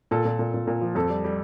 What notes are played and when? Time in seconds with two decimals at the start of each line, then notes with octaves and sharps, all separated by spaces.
0.11 A#2 A4
0.25 A#2
0.39 A#2
0.54 A#2
0.67 A#2
0.81 F3
0.95 F2 A4
1.10 G3
1.24 G3